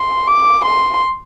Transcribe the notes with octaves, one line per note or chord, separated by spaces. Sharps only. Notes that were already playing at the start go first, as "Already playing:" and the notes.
Already playing: C6
D6
C6